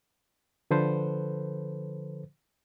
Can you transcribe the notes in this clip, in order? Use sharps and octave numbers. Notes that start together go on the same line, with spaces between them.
D3 F3 A4 B4 C5